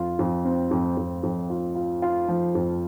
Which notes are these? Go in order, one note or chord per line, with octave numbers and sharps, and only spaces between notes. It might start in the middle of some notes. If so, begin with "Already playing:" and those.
Already playing: F2 F4
F2
C4
F2
F2
F2
F4
F4
F4
F3
F2